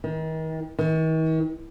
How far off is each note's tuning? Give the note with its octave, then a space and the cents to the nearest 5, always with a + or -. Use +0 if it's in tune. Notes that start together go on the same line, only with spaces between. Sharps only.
D#3 +40
D#3 +45